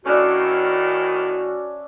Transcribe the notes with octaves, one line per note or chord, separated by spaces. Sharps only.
A2 D#3 C#4 D4 F#4 E5